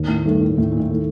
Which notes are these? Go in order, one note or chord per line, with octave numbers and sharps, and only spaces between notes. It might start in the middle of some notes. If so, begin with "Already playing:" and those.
Already playing: D#2
A2
G2 D#3 A3
A2
D#2 A2
A#2
A2
D#3 A3